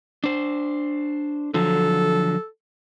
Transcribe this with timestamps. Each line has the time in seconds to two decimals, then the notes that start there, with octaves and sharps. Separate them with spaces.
0.24 D4 C5
1.54 D3 F3 F#3 A4